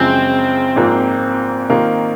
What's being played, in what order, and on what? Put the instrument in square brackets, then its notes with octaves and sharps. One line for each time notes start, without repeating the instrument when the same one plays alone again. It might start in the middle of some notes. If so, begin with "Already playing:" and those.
Already playing: [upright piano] F#1 F#2 C#3 F3 G#3 [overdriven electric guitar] C4
[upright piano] G#1 G#2 F3 A#3
D#3 A#3 F4 A#4